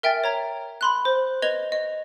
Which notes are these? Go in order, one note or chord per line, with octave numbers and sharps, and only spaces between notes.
A#4 E5 G5 G#5 A6
C#5 A#5 G#6
B5 C6 F#6
C5
B4 D#5 G#6 F7 G7
D#5